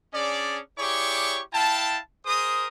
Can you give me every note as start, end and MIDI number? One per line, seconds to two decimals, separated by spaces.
0.13 0.60 61
0.13 0.60 62
0.13 0.60 68
0.13 0.60 74
0.78 1.40 64
0.78 1.40 67
0.78 1.40 68
0.78 1.40 73
0.78 1.40 74
0.78 1.40 85
1.53 1.98 64
1.53 1.98 77
1.53 1.98 79
1.53 1.98 81
2.26 2.67 68
2.26 2.67 70
2.26 2.67 72
2.26 2.67 87